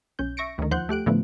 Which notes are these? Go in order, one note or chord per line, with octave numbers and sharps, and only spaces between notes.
B1 C#4 G6
E5 C#6 A#6 C#7 D7
D2 D#3
D#2 F3 C5 F#5 F#6 G6
A3 G4 F#6 D7
A2 D3 F3 A3 B3